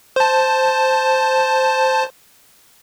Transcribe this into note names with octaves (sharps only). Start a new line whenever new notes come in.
C5 A5